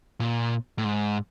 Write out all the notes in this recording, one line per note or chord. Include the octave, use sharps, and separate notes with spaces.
A#2
A2
G#2